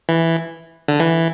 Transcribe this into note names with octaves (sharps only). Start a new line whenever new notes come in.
E3
D3
E3